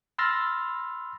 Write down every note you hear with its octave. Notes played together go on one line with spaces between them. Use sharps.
B5 C6 E6 F6 A6 A#6